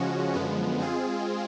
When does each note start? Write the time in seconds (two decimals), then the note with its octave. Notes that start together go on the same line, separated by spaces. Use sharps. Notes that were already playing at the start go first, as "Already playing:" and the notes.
Already playing: C#3 F3 G#3 C#4 F#4
0.34 F#2 D3 F3 G#3 B3
0.80 G#3 C4 F4 G#4